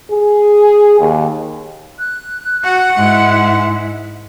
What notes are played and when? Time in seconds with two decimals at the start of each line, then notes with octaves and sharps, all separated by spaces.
0.12 G#4
1.00 D#2
1.99 F#6
2.64 F#4 F#5
2.97 G#2 G#3 E4